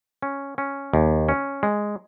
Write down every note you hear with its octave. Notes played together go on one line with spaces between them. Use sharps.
C#4
C#4
D#2
C#4
G#3